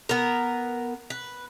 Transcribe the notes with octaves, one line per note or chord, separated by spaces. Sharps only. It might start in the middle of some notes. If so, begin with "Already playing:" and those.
B3 A#4
B4